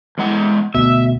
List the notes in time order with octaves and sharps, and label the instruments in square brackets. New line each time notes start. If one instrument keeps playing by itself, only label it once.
[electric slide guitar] E2 G#3 F#5
[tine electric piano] D2 B2 [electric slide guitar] E5